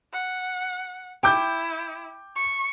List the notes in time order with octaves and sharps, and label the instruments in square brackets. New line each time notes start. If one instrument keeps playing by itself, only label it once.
[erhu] F#5
[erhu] E4 [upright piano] G5 D6 G6
[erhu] C#6